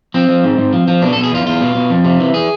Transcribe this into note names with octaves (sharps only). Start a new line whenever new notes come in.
F3 C4
F3
G#2
G#2
F3
F3
B2 D4
B2 A4
G#4
E2 F4
E2 F4
B2
B2
F2
C3
E3
G#4